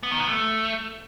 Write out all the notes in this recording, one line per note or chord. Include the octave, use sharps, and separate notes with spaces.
B3
D#3
B3
A3